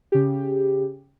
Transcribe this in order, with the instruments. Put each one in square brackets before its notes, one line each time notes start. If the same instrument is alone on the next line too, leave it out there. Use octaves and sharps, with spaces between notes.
[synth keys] C#3 G4